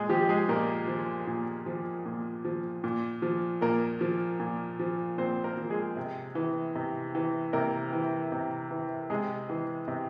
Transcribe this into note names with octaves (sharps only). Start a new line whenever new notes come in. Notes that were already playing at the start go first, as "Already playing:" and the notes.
Already playing: A#2 G#3 G#4
F3 G4
G#3 G#4
A#2 A#3 A#4
F3
A#2
F3
A#2
F3
A#2
F3
A#2 A#3 A#4
F3
A#2
F3
A#2 C4 C5
A#3 A#4
F3
G#3 G#4
C3
E3
C3
E3
C3 A#3 A#4
E3
C3
E3
C3 G#3 G#4
E3
C3